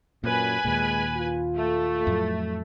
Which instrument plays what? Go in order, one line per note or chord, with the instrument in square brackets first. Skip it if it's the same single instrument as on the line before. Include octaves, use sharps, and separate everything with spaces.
[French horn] F#2 [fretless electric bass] A#2 [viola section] B4 G#5
[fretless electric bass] D#2 A#2 [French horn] G#3
[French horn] F4
[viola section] A3
[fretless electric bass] F2 A2 F#3